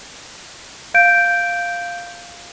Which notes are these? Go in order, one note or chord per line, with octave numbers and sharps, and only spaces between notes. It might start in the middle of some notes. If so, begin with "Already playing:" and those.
F5 G6 D7